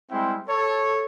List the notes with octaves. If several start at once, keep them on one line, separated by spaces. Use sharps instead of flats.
G3 G#3 C4 E4 G5 C6
A4 C#5